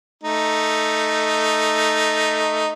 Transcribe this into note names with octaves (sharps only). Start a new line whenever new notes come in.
A3 D#4